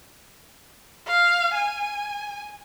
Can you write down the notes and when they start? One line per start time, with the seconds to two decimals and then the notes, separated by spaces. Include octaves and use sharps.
1.07 F5
1.54 G#5